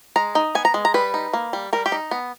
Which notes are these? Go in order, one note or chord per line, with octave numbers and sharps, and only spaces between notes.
G#3 A#5
D#4
B3 G#5
A#5
G#3
A#5
G3 B4
D#4
A#3
G3
G3 A#4
G4
D#4
B3